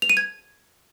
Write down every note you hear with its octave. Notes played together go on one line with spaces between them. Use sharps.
F7
D#7
G#6